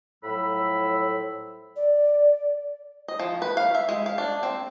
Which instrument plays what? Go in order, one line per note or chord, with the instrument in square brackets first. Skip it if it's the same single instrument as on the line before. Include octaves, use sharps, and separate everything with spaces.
[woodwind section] A2 F3 F#3 B5 E6
[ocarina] D5
[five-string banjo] D#5
F3
B4
F5
E5
G#3
F5
D4
C4